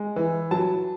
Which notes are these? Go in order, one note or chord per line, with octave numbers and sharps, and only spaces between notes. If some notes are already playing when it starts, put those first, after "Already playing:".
Already playing: G#3
E3
F#3 A5